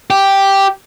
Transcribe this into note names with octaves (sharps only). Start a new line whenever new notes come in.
G4